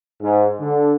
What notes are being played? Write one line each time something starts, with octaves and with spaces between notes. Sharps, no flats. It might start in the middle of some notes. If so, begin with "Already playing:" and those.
G#2
D3